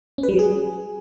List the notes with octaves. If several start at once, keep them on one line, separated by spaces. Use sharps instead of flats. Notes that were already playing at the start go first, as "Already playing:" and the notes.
C#4
B4
G3
F#3
G#4